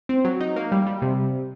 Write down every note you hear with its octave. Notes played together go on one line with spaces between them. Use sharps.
C4
F#3
D#4
A#3
G3
G3
C3